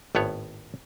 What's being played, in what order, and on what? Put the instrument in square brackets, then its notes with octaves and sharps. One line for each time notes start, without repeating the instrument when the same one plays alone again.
[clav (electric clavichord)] G#1 A2 B3 C#5